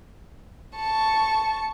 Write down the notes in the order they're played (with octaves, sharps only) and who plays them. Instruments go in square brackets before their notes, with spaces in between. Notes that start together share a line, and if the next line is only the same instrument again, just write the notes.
[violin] A5 C#6